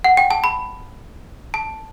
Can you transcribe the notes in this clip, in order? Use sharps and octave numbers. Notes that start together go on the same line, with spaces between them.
F#5
G5
A5
B5
A5